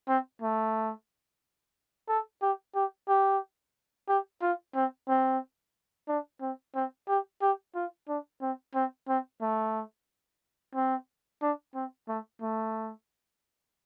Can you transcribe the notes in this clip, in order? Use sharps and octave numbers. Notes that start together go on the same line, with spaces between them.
C4
A3
A4
G4
G4
G4
G4
F4
C4
C4
D4
C4
C4
G4
G4
F4
D4
C4
C4
C4
A3
C4
D4
C4
A3
A3